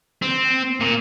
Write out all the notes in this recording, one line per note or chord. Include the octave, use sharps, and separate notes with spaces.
C4
A#2